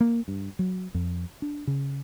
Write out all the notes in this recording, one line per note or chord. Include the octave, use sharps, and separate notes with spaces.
A#3
G2
F#3
F2
D4
C#3